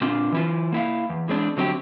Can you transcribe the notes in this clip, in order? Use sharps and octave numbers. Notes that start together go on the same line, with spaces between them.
A#2 C4 D4 F4
E3 E4 F4
A#3 E4 F5
E2
E3 G#3 C4 D4
D3 F#3 C4 F#4 G4